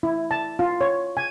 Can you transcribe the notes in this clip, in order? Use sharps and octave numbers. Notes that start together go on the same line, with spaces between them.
E4
A5
F4
C#5
G#5